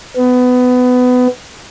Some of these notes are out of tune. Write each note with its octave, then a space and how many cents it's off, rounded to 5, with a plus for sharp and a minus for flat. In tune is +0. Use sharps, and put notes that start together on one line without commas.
B3 +20